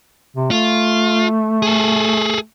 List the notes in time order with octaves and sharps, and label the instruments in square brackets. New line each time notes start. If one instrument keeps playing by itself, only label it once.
[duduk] C3
[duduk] A3 [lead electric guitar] F4
[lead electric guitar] G#4 A4